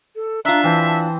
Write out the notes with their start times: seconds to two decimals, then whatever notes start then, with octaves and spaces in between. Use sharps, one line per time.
0.16 A4
0.45 D4 F4 E5 A#5
0.64 E3 C4 A5
0.87 A5